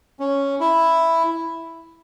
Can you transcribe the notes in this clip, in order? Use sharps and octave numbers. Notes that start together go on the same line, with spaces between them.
C#4
E4